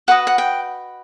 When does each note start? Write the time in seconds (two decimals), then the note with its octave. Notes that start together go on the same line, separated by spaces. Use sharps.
0.08 F#4 B4 D#5 F#5
0.27 F#5
0.38 G5